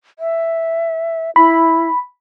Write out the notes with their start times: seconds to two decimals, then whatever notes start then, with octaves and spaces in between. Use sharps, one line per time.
0.19 E5
1.36 E4 B5